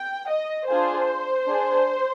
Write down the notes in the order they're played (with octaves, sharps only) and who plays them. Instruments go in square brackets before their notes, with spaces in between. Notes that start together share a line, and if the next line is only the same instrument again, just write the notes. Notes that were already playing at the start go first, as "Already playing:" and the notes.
Already playing: [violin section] G5
D#5
D4 F4 G#4 C5
D4 G#4